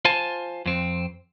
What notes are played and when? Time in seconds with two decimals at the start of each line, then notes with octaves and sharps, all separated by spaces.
0.05 F4 C5 G#5 A5
0.66 F2 C4